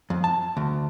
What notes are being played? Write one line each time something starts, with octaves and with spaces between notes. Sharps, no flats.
F2
A5
D2